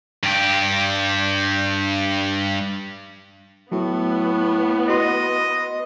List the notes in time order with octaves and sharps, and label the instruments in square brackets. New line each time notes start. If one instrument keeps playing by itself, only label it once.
[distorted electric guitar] G2 G4
[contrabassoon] A2 [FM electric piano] F#3 [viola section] B3
[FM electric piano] F#4 B4 C6 [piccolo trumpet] D#5